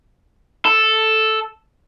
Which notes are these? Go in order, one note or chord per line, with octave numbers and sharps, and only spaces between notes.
A4